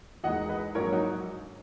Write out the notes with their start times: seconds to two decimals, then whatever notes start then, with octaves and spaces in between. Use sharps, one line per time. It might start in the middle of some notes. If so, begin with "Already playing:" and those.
0.24 E2 D#3 G#3 D#5 F#5
0.49 B4 D#5
0.75 A#1 G#2 D#3 F#3 A#4 C#5
0.93 D#4 F#4